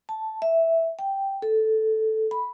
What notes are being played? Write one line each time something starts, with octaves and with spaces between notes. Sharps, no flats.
A5
E5
G5
A4
B5